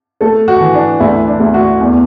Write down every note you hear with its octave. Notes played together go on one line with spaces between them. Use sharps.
A3 A4
F#4
E3
D4
D2 E4
D4
D2
F#4
E2